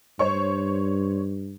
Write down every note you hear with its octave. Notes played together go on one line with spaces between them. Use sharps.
G2 C5 C#5 C#6